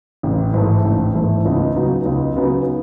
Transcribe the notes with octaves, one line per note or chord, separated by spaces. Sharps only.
A1
G#2 E3 A3
A1
G#2 E3 A3
C#2
C#3 F#3 B3 D#4
C#2
C#3 F#3 B3 D#4